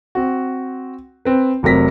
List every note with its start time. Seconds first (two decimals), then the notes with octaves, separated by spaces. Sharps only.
0.15 C4 F#4
1.25 C4 B4
1.63 F1 C3 F#3 A#4 A#6 B6